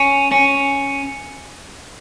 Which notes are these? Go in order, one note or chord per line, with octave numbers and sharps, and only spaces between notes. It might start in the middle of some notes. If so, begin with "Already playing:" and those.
Already playing: C#4
C#4